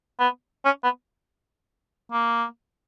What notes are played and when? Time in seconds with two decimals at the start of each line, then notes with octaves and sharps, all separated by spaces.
0.20 B3
0.65 C#4
0.83 B3
2.12 A#3